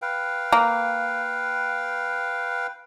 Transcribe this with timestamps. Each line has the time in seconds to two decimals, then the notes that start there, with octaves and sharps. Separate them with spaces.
0.02 B4 F5 G5
0.52 A#3